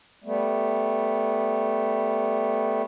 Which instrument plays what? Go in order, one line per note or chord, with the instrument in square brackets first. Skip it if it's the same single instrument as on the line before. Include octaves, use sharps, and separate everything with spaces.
[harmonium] G3 A3 B3